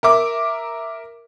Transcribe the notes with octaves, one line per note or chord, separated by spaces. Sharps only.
A#4 E5 D6